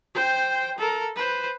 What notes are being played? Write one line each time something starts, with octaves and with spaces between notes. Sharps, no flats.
C5 G5
A4 A#4
B4 C5